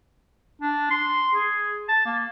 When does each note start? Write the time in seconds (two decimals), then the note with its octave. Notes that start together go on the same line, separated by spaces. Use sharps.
0.62 D4
0.91 C6
1.34 G#4
1.88 A5
2.06 A#3